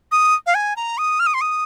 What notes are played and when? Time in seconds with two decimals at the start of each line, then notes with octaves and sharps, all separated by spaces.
0.12 D#6
0.46 F5
0.55 G#5
0.76 A#5
0.98 D#6
1.20 F6
1.26 D#6
1.34 C6
1.41 D#6